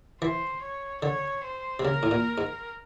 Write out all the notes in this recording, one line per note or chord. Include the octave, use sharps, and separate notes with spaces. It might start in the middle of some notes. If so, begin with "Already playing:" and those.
E3 C5
C#5
D3 C#5
C5
C3
C#3 A#4
A2
A#2
G#2